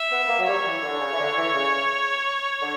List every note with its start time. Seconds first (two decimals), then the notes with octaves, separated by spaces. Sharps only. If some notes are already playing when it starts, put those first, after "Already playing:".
Already playing: E5
0.11 B3
0.23 B3
0.28 A#3
0.39 F#3
0.47 G3 C#5
0.65 E3
0.83 D3
1.00 C#3
1.13 E3
1.18 D3
1.35 E3
1.54 C#3
2.61 D3